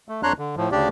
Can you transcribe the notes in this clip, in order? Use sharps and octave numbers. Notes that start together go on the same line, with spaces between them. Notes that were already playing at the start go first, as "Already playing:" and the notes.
A3
F2 D4 C#5 A#5 C6 F#6
D3
A2 F3
D2 C#3 D4 G4 D5